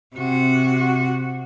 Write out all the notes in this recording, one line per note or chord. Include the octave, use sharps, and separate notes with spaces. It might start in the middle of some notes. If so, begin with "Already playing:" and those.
C3 F#4